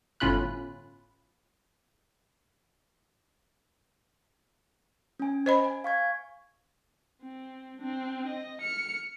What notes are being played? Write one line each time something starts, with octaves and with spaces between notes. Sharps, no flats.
G1 A2 C#4 F4 B5 F#6
C#4 G#5
C5 D#5 B5
G#5
F5 C#6 G#6
C4
C4 D4
D#5
F6 C#7